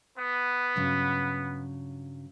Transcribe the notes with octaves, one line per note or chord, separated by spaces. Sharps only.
B3
G2 C#3 F#3